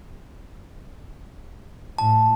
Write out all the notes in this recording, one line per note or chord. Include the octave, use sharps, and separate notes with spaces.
A2 A5